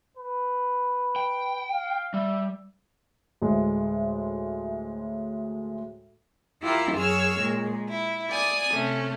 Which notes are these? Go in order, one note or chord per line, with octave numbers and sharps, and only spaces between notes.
B4
G5
F5
G3 E5
D2 A2 G#3
E4 F4 G4 A#4
F#2 G#4 C#5 E6 F6
A#2 G#3
E4
D5 G#5 D#6
C3 A3 C#4